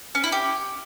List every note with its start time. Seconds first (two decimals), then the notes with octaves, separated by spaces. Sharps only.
0.15 C#4
0.24 E4
0.32 G4